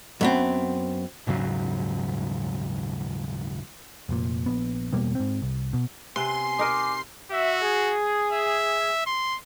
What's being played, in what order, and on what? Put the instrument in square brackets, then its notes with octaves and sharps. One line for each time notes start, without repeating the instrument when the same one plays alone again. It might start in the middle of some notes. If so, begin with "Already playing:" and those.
[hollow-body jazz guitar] F#2 B3 C4
[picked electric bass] D#1 G#2 C#3 F#3
F1 A#2
A#1 B3
E1 B2 G3 A#3
G#2 C4
C2
B2
[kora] C3 B3 [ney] G#5 [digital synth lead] C6
[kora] D#4 A#4 D#5 [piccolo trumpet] D6
[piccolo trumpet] F#4 [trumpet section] E5
[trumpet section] G#4
[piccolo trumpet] E5
C6